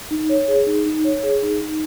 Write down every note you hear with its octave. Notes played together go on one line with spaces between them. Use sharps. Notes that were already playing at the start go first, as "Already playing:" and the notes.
D#4
C#5
G#4
D#4
D#4
C#5
G#4
D#4
D#4